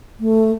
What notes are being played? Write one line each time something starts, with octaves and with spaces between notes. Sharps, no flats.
A3